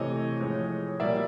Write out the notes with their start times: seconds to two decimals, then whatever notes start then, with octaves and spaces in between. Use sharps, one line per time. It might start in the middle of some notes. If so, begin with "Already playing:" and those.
Already playing: C3 E3 A3 C#5 D#5
0.40 A2 F3 G#3
1.00 B2 G3 A#3 D5 E5